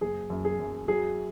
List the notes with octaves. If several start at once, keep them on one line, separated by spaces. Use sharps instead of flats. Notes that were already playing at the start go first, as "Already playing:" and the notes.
F#1 G#4
F#2
G#4
F#2
F#3 G#4